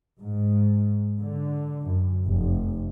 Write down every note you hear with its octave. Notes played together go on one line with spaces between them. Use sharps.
G#2
D3
F#2
F1